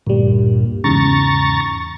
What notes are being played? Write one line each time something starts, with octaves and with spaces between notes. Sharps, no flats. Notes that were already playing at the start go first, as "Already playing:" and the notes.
D2 G2 A#2 G3
E2 G#2 C#3 A#5 C#6 A6